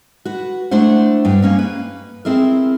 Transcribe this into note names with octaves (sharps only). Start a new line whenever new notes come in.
F#4 B4
A3 D4 E4 C5 F#5
G2 G5
A#3 C#4 D#4
B4
C4 E4 G#4 A#4